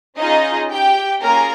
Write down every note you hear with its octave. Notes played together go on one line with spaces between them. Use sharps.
C#4 D#4 F4 G#4 D#5
G4 G5
A#3 C#4 F4 G#4 A#4 A#5